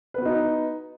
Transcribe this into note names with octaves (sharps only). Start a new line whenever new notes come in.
B3 D#4 F#4 B4